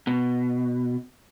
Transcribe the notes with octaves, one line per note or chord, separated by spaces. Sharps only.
B2